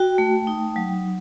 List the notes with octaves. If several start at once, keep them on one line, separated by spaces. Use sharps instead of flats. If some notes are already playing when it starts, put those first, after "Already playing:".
Already playing: F#4 G5
A3
D#4
F#3